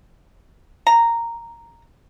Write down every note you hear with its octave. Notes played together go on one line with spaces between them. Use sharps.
A#5